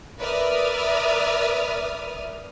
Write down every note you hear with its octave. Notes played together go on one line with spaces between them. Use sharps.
A#4 B4 D5 E5 D#6 F6